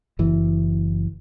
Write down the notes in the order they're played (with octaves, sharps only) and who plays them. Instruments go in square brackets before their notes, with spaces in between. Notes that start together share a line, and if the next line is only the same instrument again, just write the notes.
[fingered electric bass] F#1 E3